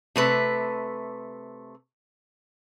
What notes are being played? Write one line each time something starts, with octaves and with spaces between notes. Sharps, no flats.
C3 A3 B4